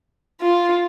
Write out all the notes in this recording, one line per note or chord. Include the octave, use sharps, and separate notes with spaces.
F4